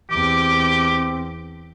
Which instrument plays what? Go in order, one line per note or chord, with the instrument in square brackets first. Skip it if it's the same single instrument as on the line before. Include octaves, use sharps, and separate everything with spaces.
[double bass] E2 [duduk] C4 [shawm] G4 [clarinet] D6